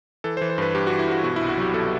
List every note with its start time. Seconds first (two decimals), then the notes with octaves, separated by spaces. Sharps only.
0.24 E3 A4
0.37 C5
0.41 E3
0.50 C5
0.58 G2 B4
0.74 G2 G4
0.87 F#4
0.91 E3
0.99 E4
1.08 G2 F#4
1.24 B2 F#4
1.36 E4
1.41 C2
1.49 F#4
1.57 F#3 G4
1.74 B2 A4